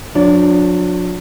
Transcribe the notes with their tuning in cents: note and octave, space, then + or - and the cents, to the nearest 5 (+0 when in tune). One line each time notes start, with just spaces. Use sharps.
F#3 -45 D4 +0 D5 -45